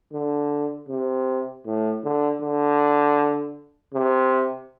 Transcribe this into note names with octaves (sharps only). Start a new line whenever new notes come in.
D3
C3
A2
D3
D3
C3